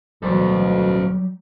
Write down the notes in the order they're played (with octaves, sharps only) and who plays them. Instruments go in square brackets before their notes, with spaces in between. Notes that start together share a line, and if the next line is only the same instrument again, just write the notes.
[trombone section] D2 B2 [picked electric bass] F#3 G3 [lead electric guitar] A4 C5